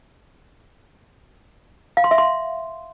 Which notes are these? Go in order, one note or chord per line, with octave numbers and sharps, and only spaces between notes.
F5
C6
E5
C6